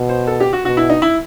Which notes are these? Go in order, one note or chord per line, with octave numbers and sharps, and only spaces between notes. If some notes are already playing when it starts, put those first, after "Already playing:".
Already playing: B2
C5
A4
G4
F#4
B2 F#4
E4
D#4
E4